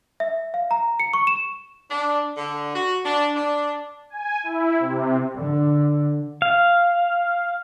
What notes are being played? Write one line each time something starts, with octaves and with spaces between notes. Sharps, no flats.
E5
F5
A#5
C#7
C#6
E7
D4
D3
F#4
D4
D4
G#5
E4
C3
D3
F5